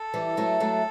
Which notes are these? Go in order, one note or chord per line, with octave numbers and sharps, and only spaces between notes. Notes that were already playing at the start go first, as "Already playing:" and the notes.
Already playing: A4
E3 G3
F#3 A3
F#3 A3